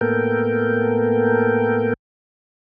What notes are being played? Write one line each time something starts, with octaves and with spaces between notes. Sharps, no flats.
A2 A#3 B3 A4 A#4 G5